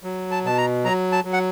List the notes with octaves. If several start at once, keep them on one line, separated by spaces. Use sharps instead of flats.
F#3
A5
B2 A5
A#5
F#3 A#5
A5
F#3
F#5